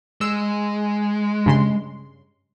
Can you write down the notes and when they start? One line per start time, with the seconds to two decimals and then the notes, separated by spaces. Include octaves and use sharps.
0.21 G#3 E6
1.46 G2 C#3 C6